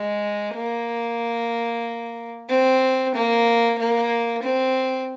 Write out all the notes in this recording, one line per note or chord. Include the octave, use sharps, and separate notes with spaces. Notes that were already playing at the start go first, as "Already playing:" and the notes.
Already playing: G#3
A#3
C4
A#3
A#3
C4